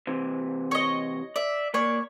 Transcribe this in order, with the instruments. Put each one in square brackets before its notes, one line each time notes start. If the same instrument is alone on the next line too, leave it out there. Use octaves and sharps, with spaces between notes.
[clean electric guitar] C3 E3
[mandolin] C#5 D#5
[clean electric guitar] D5 [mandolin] E5
[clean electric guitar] A#3 D5 [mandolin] C#5